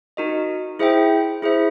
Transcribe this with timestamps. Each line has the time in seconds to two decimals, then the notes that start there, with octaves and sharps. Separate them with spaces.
0.17 D#4 F#4 A#4 D#5
0.79 E4 G#4 C5 E5 G5
1.42 E4 G#4 C5 E5